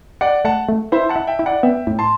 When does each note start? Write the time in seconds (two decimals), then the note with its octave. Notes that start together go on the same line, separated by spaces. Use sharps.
0.21 G4 D5 F#5
0.45 A3 F#5 A5
0.68 A3
0.92 E4 C5 E5
1.09 F#5 A5
1.16 E4
1.27 E5 G5
1.39 E4
1.46 D5 F#5
1.63 B3 E5 G5
1.87 A2
1.99 A5 C6